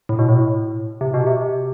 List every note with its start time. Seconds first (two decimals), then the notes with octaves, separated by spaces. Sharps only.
0.09 A2
0.19 B2
0.29 A2
1.01 C3
1.14 B2
1.27 C3